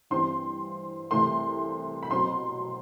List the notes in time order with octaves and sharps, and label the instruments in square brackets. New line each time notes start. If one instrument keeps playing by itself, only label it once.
[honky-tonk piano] G2 E3 G3 C4 C6
C2 C3 E3 A3 C6
B5
B2 F#3 C4 C6